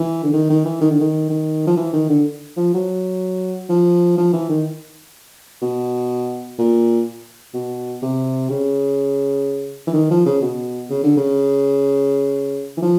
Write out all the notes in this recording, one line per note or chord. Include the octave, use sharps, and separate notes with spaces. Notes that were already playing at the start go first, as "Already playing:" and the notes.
Already playing: E3
D3
D#3
D#3
E3
D#3
D3
D#3
D#3
F3
E3
D#3
D3
F3
F#3
F3
F3
E3
D#3
B2
A#2
B2
C3
C#3
E3
D#3
F3
C#3
B2
C#3
D3
C#3
E3
F3